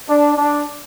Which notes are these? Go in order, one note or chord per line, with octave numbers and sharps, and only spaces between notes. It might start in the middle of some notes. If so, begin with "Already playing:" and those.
D4
D4